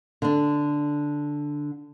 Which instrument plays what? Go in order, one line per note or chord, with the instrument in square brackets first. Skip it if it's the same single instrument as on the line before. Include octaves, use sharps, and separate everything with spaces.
[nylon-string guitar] D3 D4